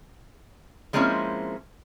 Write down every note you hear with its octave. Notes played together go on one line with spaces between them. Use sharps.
F3 G#3 A#3 C4 C#4 E4